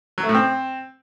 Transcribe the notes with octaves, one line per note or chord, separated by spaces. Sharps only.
F#3
A3
A2
C4